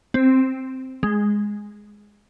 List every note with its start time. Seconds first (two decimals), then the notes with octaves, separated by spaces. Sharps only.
0.14 C4
1.03 G#3